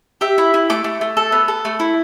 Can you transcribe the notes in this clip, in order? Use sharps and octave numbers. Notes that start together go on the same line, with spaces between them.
G4 E5
E4
E4
A3 D6
A3
A3
A4
B3
A4
A3
E4